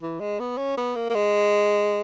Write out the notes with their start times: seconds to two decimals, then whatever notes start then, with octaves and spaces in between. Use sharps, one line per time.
0.02 E3
0.20 G#3
0.39 B3
0.58 C#4
0.77 B3
0.96 A#3
1.10 A#3
1.15 G#3